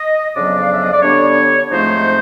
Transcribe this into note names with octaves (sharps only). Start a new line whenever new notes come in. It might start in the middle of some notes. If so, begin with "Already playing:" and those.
Already playing: D#5
F2 C#3 F#3 B3 D4 D5
F5
E5
D#5
D5
D3 G3 B3 D4 C#5
G#2 F3 A3 C4 D#4 C5